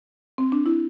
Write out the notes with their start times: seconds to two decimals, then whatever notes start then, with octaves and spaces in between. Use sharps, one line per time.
0.38 C4
0.52 D4
0.66 E4